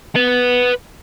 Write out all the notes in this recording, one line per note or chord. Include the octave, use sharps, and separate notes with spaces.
B4 F#5